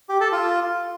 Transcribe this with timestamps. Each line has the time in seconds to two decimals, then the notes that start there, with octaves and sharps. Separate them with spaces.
0.09 G4
0.21 A4
0.32 F4